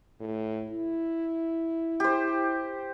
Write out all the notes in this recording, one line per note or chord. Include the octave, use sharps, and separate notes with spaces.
A2
E4
G4 C5